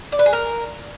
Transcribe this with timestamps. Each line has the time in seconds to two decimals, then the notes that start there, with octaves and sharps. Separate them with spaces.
0.12 D5
0.19 B4
0.26 G#4
0.33 A#4